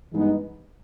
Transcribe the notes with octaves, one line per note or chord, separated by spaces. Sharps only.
G2 E3 G#3 B3 D#4